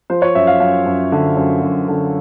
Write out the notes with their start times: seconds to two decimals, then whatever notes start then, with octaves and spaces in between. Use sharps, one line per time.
0.10 F3 C5
0.22 C#5
0.35 F#2 E5
0.47 F5
0.60 F#2 F5
0.86 F#2
1.12 D3
1.37 F#2
1.62 F#2
1.88 D3